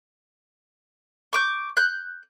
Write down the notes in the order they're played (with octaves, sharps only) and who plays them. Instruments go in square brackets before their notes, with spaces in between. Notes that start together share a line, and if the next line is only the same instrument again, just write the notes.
[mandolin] C#6 D6 G6
F#6 G6